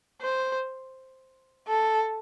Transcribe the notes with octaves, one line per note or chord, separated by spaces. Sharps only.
C5
A4